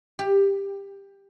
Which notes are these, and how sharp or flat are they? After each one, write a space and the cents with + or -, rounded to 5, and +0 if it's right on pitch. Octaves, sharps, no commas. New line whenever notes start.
G4 +15